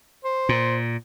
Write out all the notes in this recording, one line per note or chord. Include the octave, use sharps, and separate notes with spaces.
C5
A#2